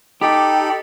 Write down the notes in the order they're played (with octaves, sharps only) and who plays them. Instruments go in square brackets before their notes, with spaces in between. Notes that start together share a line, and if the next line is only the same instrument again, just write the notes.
[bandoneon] D#4 A4 B5 [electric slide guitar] G4